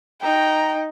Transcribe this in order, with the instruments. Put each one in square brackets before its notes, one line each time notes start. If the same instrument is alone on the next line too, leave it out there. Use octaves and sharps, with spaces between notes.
[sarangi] D#4 [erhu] G5 [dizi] A#5